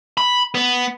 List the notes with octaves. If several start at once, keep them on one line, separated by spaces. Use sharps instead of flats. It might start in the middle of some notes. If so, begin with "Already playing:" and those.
B5
B3